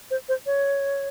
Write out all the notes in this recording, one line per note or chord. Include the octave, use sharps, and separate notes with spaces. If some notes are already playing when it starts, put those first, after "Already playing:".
C5
C5
C#5